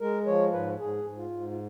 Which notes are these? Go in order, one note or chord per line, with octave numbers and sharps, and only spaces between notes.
G#3 A#4
F3 C#5
G#2 B4
G#2 G#4
G#2
F4
G#2
F4